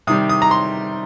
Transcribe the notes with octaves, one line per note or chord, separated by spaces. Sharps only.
C3 D#3 G3 D#6
D#6
A#5
C6